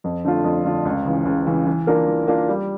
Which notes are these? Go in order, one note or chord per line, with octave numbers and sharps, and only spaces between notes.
F2
D3 A3 D4 F4
F2
D3 A3 D4 F4
C#2
C#3 E3
C#2
C#3 E3
E3
A#3 D4 F4 A#4
E3
A#3 D4 F4 A#4
G3